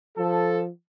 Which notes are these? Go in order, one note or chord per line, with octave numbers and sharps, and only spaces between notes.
F3 A4